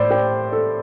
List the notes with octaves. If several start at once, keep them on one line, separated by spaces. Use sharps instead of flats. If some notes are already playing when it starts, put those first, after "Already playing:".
Already playing: A2 C5 D5
G4
A4